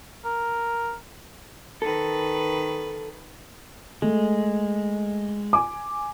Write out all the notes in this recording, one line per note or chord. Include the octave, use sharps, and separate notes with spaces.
A#4
D#3 A4 B4
G#3 A3
G#5 D6